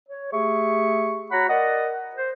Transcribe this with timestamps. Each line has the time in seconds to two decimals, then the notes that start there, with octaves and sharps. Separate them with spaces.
0.08 C#5
0.32 A3 G4 G#4 E5 C#6
1.31 F#4 C#5 F#5 A#5 B5
1.48 A#4 D5 D#5 F#5
2.15 C5